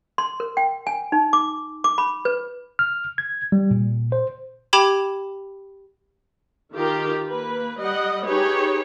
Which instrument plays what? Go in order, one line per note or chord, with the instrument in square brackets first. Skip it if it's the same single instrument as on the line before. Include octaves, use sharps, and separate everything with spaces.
[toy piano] C6
A#4
G5
G#5
D#4
D6
D6
B5
B4
[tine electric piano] F6
G#6
G3
A#2
C5
[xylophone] G4 G5 B5 D6 G#6 E7
[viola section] D#3 F4 G4 A#4
A#3 B4
G3 D#5 F#5
D#4 G4 G#4 B4 C#5